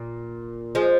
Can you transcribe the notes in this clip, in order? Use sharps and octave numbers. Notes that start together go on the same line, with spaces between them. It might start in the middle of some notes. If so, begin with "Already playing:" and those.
Already playing: A#2
F3 G#3